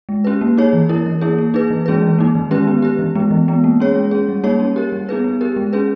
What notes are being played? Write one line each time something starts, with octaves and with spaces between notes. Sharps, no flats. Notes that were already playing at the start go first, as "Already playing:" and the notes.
G#3
C#4 G4 B4
A#3
D#4 G#4 C#5
E3
A#3 E4 A#4
E3
A#3 E4 G#4
A#3
D#4 G#4 B4
E3
G#3 C#4 G#4 B4
E3
A#3 D#4
D#3
G#3 C#4 G4 B4
B3
G4 B4
E3
G#3 B3
E3
G#3 B3
A#3
C#4 G#4 C#5
G#3
C#4 G#4
G3
A#3 D#4 G#4 C#5
C#4
G4 A#4
G3
B3 D#4 G#4 B4
B3
G4 A#4
G#3
C#4 G#4 B4